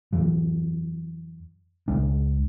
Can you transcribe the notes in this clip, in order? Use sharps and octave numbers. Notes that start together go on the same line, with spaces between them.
F2 E3 F#3
C#2 G#3 D4